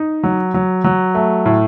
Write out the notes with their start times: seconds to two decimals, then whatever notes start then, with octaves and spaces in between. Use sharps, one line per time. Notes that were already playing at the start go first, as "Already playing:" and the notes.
Already playing: D#4
0.23 F#3
0.54 F#3
0.84 F#3
1.15 A3
1.45 A2